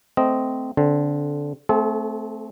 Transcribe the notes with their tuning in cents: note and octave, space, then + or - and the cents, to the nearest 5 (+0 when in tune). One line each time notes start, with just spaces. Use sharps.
A3 +0 C4 -15 D#5 +0
D3 -15 C4 +0
A3 +0 C4 +0 A4 -45